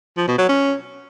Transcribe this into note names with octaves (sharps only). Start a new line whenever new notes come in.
F3
B2
F#3
C#4